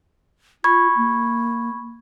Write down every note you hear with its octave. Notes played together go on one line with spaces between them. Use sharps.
F4 B5 C#6 G#6
A#3